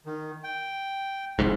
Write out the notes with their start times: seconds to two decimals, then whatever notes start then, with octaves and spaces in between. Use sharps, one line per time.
0.06 D#3
0.44 G5
1.39 F1 C2 G#2